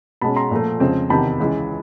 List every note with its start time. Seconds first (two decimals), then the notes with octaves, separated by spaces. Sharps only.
0.21 B2 G#3 C#4 A5 B5
0.36 A#5 C6
0.51 A#2 F3 A3
0.80 F2 C#3 F3 G#3 C4
1.10 E2 C3 D#3 A5 B5
1.39 C#2 C#3 E3 G#3